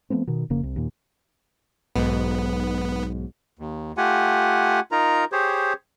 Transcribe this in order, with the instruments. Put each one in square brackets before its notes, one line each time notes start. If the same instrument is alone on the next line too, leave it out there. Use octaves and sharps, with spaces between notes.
[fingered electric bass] F3 A3 B3 C4
B2 D#3
F1 C#3 A#3
C2
D#2 A#2
[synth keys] B1 G#2 [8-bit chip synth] B3
[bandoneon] D#2
A3 F4 G4 F#5 G#5
D#4 F4 A#4 A#5
G4 G#4 C5 C#5